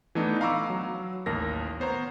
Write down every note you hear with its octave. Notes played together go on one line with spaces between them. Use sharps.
E3 A3 B3 D4 D#4
F5 A#5 B5 C#6 D6 E6
F#3
A1 D#2 A#4 A#6
B3 C5 C#5 A#5